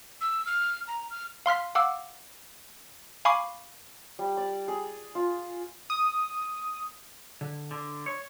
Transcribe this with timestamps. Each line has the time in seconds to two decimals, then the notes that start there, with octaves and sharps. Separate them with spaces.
0.21 E6
0.46 F6
0.88 A#5
1.10 F6
1.46 F5 C6 F6 B6
1.75 F5 F#5 D6 E6
3.25 F5 G#5 B5 C#6 D6 C7
4.19 G3
4.37 D5
4.68 G#4
5.15 F4
5.90 D#6
7.41 D3
7.71 D3
8.06 C#5